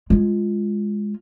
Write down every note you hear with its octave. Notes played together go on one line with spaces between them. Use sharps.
G#3 F4